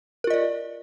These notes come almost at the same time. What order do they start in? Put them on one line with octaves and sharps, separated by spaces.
A#4 F4 D#5 D5